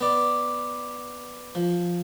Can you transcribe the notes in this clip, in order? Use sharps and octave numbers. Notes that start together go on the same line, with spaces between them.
B3 D5
F3